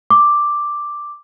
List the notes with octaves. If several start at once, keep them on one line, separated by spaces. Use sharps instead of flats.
D6